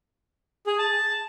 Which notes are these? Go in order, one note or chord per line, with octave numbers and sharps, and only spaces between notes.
G#4
A5